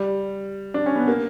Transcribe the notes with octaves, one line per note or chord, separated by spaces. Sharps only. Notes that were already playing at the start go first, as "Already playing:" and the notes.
Already playing: G3
D4
C#4
B3
A#3